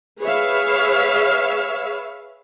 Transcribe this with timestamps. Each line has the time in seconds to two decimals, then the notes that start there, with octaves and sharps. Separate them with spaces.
0.21 G#4 B4 C#5 E5 F5